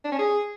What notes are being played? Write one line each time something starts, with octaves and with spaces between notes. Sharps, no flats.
D4
C#4
G#4